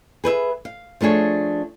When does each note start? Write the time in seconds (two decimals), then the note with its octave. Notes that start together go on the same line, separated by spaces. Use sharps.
0.24 G#4 B4 C5 E5
0.65 F5
1.01 F3 A3 D4 G#4 C#5